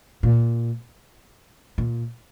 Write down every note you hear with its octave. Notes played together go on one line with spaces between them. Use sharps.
A#2
A#2